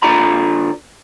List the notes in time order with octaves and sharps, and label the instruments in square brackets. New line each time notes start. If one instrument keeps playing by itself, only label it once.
[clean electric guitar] D3 F4 D5 A#5 B5